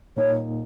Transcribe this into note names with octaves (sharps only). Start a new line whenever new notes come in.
A#2 A#3 D#4 C#5